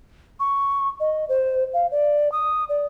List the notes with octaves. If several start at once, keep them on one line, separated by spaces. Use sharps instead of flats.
C#6
D#5
C5
F5
D5
D#6
D5